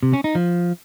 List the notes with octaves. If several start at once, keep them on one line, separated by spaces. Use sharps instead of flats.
C3
C#4
D#4
F3